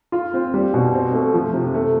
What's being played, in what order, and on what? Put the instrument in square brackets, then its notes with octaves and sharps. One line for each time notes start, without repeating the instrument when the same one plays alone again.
[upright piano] F4
C4
G3
B2
C4
A3
F3
C3
A3